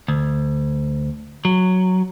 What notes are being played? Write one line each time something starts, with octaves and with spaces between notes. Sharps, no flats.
D2
F#3